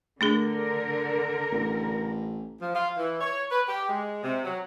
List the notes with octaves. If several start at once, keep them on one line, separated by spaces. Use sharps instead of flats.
D3 A3 D4 G#4 A#4
A1
F3
F4
E3
C#5
B4
G4
G#3
C3
F#3